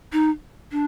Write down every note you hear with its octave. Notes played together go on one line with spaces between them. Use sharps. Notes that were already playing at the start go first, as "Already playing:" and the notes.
D#4
D4